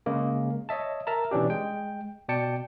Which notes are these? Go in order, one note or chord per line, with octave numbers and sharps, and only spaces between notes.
C#3 G#3 A#3
C#5 D#5 E5 A5
A#4 E5 A5 A#5
B2 E3 C#4 D4 G4
G#3 G5
B2 D5 G5 A5 C#7